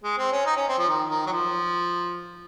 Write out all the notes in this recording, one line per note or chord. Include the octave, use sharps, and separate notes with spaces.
G#3
C4
C#4
D#4
C#4
C4
F3
D#3
D#3
F#3
F3